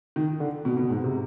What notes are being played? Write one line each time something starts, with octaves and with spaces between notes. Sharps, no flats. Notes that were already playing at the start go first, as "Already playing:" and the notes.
D#3
D3
B2
B2
G#2
C3